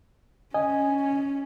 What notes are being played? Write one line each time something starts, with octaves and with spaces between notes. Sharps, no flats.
C#4 D#5 G#5